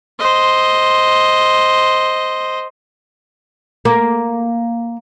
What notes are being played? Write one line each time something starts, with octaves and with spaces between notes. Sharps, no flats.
C5 D#5
A#3